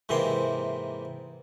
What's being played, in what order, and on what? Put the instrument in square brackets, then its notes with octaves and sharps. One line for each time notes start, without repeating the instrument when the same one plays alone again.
[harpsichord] G#2 C3 E3 A#3 A#5 C6